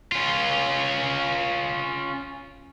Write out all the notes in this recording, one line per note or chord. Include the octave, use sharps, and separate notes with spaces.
C#4 F4